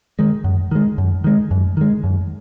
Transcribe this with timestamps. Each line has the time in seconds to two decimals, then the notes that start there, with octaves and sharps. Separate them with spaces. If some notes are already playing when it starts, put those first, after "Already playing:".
0.19 D#3 G#3
0.44 F#2
0.71 D#3 G#3
0.98 F#2
1.24 D#3 G#3
1.51 F#2
1.77 D#3 G#3
2.04 F#2